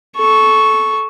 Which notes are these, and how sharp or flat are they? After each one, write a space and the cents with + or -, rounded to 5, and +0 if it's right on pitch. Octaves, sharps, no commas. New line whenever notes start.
A4 -15 C#6 +0